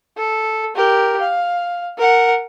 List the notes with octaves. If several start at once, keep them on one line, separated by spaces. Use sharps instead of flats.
A4
G4 A#4
F5
A#4 F#5